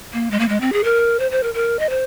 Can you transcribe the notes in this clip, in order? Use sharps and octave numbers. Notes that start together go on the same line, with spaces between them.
A#3
G#3
A#3
G#3
C4
G#4
A#4
C5
C5
A#4
A#4
D#5
C5